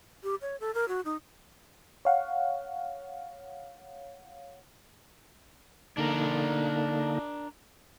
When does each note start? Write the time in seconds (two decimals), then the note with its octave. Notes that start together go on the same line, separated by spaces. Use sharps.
0.23 G4
0.42 C#5
0.60 A4
0.74 A#4
0.88 F#4
1.05 D#4
2.05 C#5 F5 F#5
5.98 D3 A#3 D4 D#4 A#4